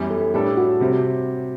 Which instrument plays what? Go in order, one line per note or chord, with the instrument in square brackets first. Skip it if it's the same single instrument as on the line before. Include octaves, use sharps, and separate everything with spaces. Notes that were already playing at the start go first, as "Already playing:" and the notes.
Already playing: [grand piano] F#2 E3 G3 B3
[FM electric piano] A4
[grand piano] A2 G3 D4 A4 [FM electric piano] G4
[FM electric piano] F#4
[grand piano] C3 G3 C4